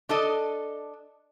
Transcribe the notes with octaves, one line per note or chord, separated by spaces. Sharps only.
D4 A4 D#5